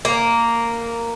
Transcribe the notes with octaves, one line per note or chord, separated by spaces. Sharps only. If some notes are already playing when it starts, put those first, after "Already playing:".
A#3